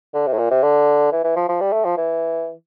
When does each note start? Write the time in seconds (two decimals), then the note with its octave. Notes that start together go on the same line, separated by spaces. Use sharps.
0.14 D3
0.27 C3
0.33 A2
0.38 A#2
0.51 C3
0.63 D3
1.12 E3
1.24 E3
1.36 F3
1.49 F3
1.60 G3
1.73 A3
1.85 F3
1.97 E3